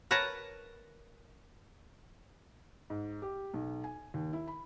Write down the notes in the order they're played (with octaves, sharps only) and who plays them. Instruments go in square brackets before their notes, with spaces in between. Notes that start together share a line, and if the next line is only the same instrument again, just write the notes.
[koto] A#4 B4 C#5 A5 A#5
[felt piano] G#2
G4
B1
G#5
D#2
E4
B5